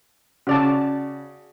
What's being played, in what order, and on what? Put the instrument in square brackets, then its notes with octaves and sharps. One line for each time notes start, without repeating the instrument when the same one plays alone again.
[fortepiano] C#3 [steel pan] F#4 D5 A5